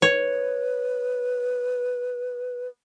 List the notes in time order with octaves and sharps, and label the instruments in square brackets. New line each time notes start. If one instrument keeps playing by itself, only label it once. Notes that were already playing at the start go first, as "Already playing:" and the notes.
[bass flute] B4 [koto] C#5